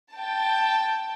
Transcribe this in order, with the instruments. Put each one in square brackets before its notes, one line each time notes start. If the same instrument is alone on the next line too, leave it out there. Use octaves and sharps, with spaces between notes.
[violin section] G5 A5